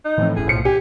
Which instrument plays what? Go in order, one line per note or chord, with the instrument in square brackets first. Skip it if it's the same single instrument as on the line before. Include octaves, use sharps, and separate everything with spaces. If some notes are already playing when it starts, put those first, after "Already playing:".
[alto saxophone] D#4
[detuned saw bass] A2 [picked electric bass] E3 F3 C4
[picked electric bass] D1 G1 C#4 [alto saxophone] G#4
[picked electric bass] B1 B2 [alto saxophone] F3 [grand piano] C#7
[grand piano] G4 [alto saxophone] G#5